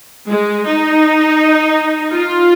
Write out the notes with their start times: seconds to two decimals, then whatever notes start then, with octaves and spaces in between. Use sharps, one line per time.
0.29 G#3
0.65 D#4
2.12 F4